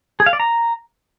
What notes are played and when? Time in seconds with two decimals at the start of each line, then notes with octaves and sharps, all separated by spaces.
0.20 G#4
0.26 F5
0.33 D5
0.40 A#5